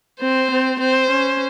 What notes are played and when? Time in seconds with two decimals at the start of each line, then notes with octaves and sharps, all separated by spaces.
0.21 C4 C5
0.51 C4
0.80 C4 C5
1.10 C#4